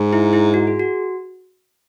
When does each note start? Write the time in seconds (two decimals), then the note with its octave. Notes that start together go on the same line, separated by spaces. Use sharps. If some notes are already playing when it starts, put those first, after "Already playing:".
Already playing: G#2
0.13 E4
0.33 E4
0.54 F#4
0.67 G#4
0.79 F#4